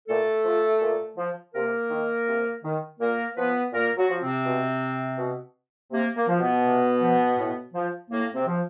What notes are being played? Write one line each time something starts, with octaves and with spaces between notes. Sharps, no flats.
A#2 A3 A4
F3
A#2
F3
C3 A#3 A#4
D#3
C3
D#3
A#2 A#3 A#4
F3 B3 B4
A#2 A#3 A#4
F#3 F#4
F3
C3 C4
B2
B2
C3 A#3
A#3
F3
B2 B3
C3
F3
A2
F3
A2 A#3
C3 C4
F3